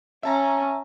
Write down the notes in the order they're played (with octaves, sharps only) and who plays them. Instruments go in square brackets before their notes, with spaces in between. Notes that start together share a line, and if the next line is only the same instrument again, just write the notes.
[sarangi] C#4 [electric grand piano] E5 A5 A#5